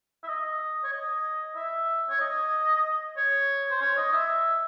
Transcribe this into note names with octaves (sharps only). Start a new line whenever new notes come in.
E5
D#5
C#5
D#5
E5
C#5
D#5
C#5
C5
C#5
D#5
E5